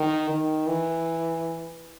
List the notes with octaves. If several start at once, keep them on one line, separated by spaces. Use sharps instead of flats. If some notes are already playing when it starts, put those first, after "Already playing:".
Already playing: D#3
D#3
E3